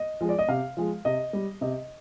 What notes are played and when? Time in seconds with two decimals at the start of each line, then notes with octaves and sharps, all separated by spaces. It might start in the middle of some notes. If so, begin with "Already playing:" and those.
Already playing: D#5
0.21 F3 G#3
0.29 D5
0.39 D#5
0.48 C3 F5
0.77 F3 G#3
1.05 C3 D#5
1.33 G3
1.61 C3 D#5